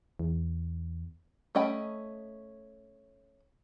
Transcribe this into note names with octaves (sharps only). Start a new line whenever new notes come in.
E2
A3 C#4 D#5 G5 B5